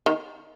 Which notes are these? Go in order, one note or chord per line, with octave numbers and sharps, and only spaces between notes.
D#3